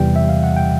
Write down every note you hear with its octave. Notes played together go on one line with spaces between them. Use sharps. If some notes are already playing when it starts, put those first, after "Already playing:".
Already playing: E2 C3 E3 G3 G5
E5
F5
F#5
G5